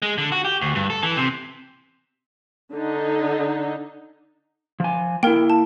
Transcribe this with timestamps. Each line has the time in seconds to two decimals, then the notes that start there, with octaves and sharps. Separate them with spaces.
0.02 G#3
0.18 D3
0.32 F#4
0.45 G4
0.61 D2
0.75 G2
0.90 A4
1.03 E3
1.17 C3
2.73 D3 D#4
4.80 F3 G#5
5.23 A#3 E4 A#4 G5
5.50 A5